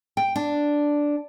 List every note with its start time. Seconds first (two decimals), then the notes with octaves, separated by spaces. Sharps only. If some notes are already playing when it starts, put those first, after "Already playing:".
0.17 G5
0.36 D4